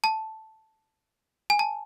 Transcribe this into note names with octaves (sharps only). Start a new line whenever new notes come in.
A5
G#5
A5